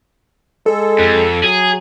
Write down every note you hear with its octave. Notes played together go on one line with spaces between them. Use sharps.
G#3 A4
F2
F#3 G#4